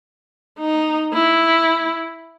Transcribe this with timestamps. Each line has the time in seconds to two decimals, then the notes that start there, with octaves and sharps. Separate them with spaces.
0.59 D#4
1.13 E4